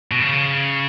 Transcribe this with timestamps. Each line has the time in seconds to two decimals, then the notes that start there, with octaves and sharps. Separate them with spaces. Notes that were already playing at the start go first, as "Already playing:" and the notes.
0.11 B2
0.20 C#3